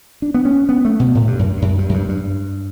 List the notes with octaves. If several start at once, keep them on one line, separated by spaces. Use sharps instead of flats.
D4
B3
C#4
B3
A3
B2
A2
G2
F#2
G2
F#2
G2
F#2
G2
G2